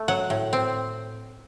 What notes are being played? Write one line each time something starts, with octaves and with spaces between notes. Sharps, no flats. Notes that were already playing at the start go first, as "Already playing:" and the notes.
Already playing: A3
F#3 F#5
A2
C4